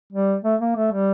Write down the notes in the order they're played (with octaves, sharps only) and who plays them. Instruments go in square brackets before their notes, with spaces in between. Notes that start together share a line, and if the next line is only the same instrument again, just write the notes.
[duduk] G3
A3
A#3
A3
G3